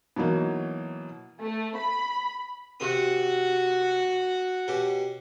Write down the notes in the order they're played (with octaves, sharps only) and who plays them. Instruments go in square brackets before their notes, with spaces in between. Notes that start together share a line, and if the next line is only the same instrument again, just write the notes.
[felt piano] B2 E3 F#3 A#3 D#4
[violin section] A3
B5
[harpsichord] C3 D#6 [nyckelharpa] F#4 F#5
[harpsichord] B2 C#4 G4